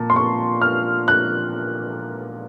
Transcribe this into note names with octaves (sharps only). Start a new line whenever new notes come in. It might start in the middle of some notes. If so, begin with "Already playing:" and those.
Already playing: A#2 A5
C6
C#6
F6
F#6